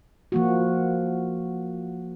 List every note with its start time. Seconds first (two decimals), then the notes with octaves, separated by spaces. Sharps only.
0.32 F3 A#3 F#4